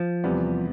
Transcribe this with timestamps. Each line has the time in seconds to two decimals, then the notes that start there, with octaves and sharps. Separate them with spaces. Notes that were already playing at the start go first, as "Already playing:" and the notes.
Already playing: F3
0.24 E2 C3 G3 B3